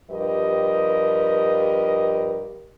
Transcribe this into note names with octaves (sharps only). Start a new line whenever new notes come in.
G2 F3 G4 A#4 B4 D#5